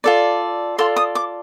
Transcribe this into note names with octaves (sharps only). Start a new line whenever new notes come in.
F4 A4 D5
F4 A4 D5 C6
D#6
D6